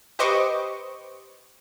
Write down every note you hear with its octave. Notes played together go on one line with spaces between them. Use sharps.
G4 B4 C5 D#5 C#6 D6